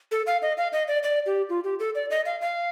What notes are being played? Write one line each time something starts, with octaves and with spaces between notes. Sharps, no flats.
A4
F5
D#5
F5
D#5
D5
D5
G4
F4
G4
A4
D5
D#5
F5
F5